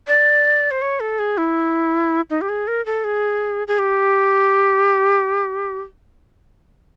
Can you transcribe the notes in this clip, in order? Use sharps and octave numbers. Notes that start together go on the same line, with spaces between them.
D5
C5
C#5
A4
G#4
E4
D#4
G4
G#4
A#4
A4
G#4
G#4
G4